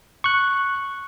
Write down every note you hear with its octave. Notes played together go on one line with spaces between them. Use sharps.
C#6 F#6